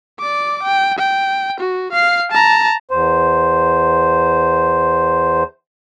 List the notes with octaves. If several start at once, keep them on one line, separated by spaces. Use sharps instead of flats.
D5 D6
G5
G5
F#4
F5 C7
A5 A#5
E2 C5